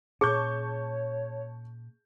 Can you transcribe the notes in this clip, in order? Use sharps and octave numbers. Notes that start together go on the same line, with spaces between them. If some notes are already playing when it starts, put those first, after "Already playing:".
A#2 C#4 G#4 C#5 A5 C#6 G6